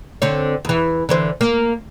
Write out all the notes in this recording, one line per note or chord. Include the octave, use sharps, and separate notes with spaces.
D3 C4 C#5
E2 E3
D3 E3 C5
A#3